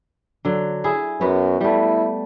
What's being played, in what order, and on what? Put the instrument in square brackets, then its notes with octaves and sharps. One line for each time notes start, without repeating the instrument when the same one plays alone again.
[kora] D3 F#3
E4 G#4
[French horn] F#2 [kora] B3 F#4 B4
[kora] G3 A3 [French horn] E4